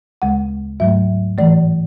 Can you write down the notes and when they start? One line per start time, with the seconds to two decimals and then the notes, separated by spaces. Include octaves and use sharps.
0.22 D2 C#3 G#3 F#5
0.80 G#2 F#3 A3 E5
1.38 A2 E3 A3 D5